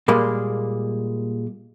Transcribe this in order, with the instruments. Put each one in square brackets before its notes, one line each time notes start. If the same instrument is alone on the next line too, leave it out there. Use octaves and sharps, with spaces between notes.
[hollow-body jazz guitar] A#2 G3 G#3 A#3